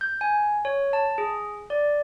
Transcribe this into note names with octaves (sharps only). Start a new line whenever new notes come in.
G6
G#5
C#5
A5
G#4
D5